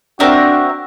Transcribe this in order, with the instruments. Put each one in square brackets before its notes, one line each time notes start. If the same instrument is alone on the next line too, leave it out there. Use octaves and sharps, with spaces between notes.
[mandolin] C4 A#4 E5 [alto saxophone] D4 [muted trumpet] F#4